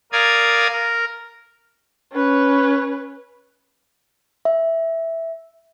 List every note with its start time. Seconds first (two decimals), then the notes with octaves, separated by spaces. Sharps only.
0.12 A#4 D5 F5 D#6 G#6
0.72 A#4
2.13 C#4 B4
4.45 E5